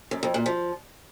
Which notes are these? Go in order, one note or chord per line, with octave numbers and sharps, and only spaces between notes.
F#2
F2
A#2
F3